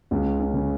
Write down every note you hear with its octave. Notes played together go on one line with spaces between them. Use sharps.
C#2 C#4
C#4
C#3